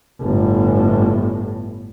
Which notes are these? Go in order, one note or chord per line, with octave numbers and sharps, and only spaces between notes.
G1 A2